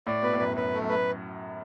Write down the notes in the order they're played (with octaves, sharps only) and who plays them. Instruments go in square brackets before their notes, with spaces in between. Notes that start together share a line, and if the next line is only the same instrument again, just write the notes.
[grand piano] A2 [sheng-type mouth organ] D5
[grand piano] B2 [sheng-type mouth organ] B4
[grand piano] A2
[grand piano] F#2 [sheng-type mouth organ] B4
[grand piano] F#2 [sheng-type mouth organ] B4
[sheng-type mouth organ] A3
[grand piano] F#2
[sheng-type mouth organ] B4